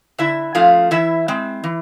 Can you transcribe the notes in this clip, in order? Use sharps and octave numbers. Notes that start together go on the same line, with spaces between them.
D3 E4 E5
F3 A3 C#4 F4 F5
E3 E4 E5
G#3 C4
E3